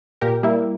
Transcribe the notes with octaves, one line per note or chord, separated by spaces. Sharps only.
A#2 G4 A#4
G3 A#3 E4